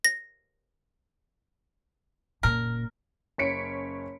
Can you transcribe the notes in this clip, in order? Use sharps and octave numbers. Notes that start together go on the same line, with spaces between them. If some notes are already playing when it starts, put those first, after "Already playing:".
A#6
F#1 A#2 A#4
F#1 C#4 C#5 B6 C#7 D7